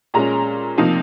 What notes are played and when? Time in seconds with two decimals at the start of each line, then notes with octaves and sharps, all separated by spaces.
0.14 A#2 G#3 C#4 A#5
0.78 C3 F3 A#3 D#4